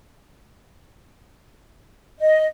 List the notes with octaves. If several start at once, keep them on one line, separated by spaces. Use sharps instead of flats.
D#5